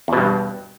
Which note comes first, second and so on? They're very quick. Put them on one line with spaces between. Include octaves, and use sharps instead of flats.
E2 B2 G2